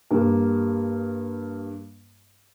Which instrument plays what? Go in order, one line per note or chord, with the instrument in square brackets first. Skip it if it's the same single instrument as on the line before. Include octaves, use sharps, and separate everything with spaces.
[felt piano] G2 A#3